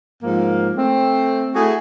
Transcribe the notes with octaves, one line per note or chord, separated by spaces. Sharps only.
G#2 F3 A#3
A3 C4
A3 E4 F#4 G#4